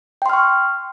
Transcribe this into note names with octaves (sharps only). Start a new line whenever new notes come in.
G5 C6 C#6 F6